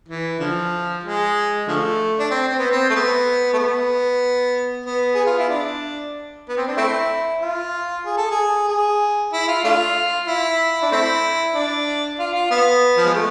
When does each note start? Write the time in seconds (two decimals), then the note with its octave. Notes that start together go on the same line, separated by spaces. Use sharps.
0.08 E3
0.40 D3 F3
1.03 G#3
1.68 D3 F3 A3
2.19 D4
2.31 C4
2.48 C4
2.59 B3
2.71 C4
2.90 A3
2.95 B3
3.53 A3
3.58 B3
4.86 B3
5.14 G#4
5.26 F4
5.38 E4
5.49 D4
6.49 B3
6.57 C4
6.67 D4
6.77 A3 C4 E4
7.41 F4
8.04 G#4
8.17 A4
8.31 G#4
8.69 G#4
9.32 E4
9.48 F4
9.64 A3 D4 F4
10.27 E4
10.82 D4
10.91 A3 C4 E4
11.54 D4
12.19 F4
12.34 F4
12.51 B3
12.97 F3
13.05 G#3
13.14 A3